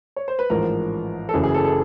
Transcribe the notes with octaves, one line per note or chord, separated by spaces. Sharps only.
C#5
C5
B4
A1 G#2 F3 A#4
A4
F#1 F#2 C#3 E3 G#4
G#4
A4
A4